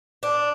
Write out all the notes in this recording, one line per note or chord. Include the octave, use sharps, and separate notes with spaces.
D4